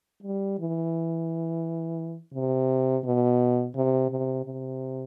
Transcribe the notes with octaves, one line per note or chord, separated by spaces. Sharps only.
G3
E3
C3
B2
C3
C3
C3